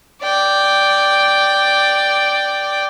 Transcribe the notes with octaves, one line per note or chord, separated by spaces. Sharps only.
D5 G5